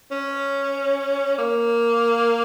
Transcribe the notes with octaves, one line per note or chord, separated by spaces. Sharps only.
C#4
A#3